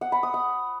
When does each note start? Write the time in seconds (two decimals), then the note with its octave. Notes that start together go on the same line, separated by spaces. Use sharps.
0.01 F#5
0.12 B5
0.23 D#6
0.34 F#5